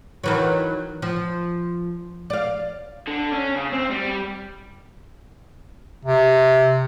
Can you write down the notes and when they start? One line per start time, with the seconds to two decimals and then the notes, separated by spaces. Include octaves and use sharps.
0.24 D#3 E3 F#3
1.02 F3
2.30 D5 F5
3.08 D3
3.32 C#4
3.56 C#3
3.73 C4
3.91 G3
6.05 C3